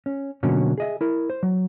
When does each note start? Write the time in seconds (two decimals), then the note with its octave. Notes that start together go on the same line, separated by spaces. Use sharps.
0.06 C#4
0.43 B2 D3 F#3 A#3 C#4
0.78 G#4 D#5 E5
1.01 E4 A#4
1.30 C5
1.43 F#3